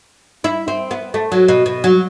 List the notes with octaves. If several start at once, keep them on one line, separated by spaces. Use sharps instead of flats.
E4
C4
B3
A3
F#3
B2
B2
F#3